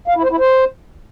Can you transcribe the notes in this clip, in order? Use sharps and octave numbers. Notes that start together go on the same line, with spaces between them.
F5
E4
C5
E4
C5